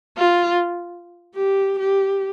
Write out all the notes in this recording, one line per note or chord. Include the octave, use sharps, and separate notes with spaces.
F4
G4
G4